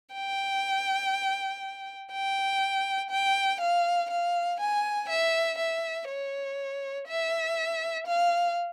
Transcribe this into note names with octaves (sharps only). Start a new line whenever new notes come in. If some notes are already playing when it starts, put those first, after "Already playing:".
G5
G5
G5
F5
F5
G#5
E5
E5
C#5
E5
F5